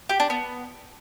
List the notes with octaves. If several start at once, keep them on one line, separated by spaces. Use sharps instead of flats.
G4
D4
B3